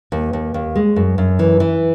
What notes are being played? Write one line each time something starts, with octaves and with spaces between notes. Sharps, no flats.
D#2
D#2
D#2
G#3
F#2
F#2
E3
E3